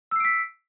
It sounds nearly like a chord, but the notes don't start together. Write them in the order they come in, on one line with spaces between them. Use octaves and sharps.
E6 C7 D7 B6